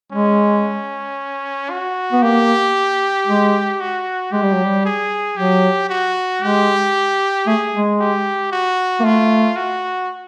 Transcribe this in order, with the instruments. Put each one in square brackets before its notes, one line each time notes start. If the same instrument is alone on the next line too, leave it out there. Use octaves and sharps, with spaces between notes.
[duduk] G#3 [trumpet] C#4
[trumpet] F#4
[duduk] B3
[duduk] A#3 [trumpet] G4
[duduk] G#3
[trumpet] F#4
[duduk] G#3 [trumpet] G4
[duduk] G3
F#3
G3
[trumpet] G#4
[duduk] F#3 [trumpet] G4
[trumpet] F#4
[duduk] G#3 [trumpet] G4
[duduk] A3 [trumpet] G#4
[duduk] G#3
[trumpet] G4
F#4
[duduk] A#3
[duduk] A3 [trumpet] F4
[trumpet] F#4